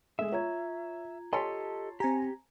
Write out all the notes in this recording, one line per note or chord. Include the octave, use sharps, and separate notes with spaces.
G#3 A3 G#4 E5
F4 C#5 A#5 G#6
G4 A4 C#5 D#5 A5 C6
C4 G4 G#5 A#5